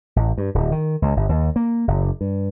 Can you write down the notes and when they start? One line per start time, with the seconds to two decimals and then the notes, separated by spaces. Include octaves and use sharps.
0.16 A1
0.38 G2
0.54 D1
0.72 D#3
1.02 C#2
1.16 G1
1.29 D#2
1.56 A#3
1.88 F#1
2.21 G2